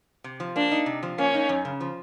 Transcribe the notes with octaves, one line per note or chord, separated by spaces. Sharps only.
C3
F3
A#3 D4
D#4
C3
F3
A#3 C#4
D#4
F#2
C#3
F3